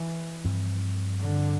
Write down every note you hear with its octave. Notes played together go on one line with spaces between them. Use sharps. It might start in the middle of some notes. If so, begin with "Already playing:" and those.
Already playing: E3
G2 F3 C4
D3